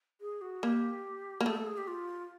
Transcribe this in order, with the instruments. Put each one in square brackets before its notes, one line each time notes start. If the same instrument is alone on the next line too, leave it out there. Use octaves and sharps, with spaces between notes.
[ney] G#4
F#4
[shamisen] A#3 [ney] G4
[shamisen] A#3
[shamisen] A3 [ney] G#4
[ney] A4
G#4
G4
F4